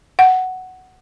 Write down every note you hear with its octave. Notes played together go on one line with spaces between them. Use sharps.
F#5